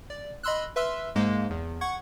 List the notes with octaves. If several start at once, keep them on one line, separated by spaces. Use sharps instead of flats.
D5
D#5 B5 C6 E6 F#6
B4 E5 C6 E6 F6
G#2 G#3 A#3 C5
E2
F#5 C#6 G#6